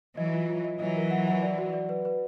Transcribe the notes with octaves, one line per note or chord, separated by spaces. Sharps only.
E3 F#3 D#5
F4
F4
D#5
E3 F#3 D#5
A#4
F#5
F#5
D5
F#4
D5
B4
B4